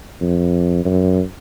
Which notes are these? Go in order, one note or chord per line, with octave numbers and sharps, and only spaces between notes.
F2
F#2